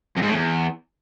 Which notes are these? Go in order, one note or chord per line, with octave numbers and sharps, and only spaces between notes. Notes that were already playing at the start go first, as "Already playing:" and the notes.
F2
G#2
A2
E2